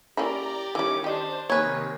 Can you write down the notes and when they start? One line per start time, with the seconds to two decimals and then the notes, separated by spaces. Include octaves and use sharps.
0.17 A#3 C#4 E4 G4 D5 A#5
0.75 D#3 E3 G3 C#4 D6
1.04 D4 G4 C5 D#5
1.50 C3 D#3 A#3 B4 C#5 G#5